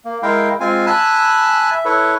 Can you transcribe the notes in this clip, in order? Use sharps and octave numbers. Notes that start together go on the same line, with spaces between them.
A#3
G#3 E4 A#4 F5 G5
G#3 C4 F4 F5 G#5
G#5 A5 B5 E6 F#6
E5
E4 A4 B4 C#5